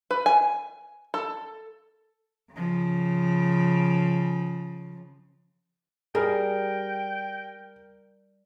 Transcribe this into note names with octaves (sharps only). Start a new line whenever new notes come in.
B4
G#5
A4
C#3 F3
G3 G#4 A#4 G5